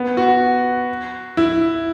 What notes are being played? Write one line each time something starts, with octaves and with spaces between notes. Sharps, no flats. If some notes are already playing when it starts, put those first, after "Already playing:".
Already playing: B3
F#4
E4